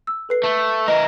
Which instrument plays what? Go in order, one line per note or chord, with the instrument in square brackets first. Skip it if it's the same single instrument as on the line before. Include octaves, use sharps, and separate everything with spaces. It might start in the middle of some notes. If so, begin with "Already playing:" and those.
[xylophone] E6
A4 B4 C7
[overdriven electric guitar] A3
[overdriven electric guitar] E3 A#4 [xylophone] D#5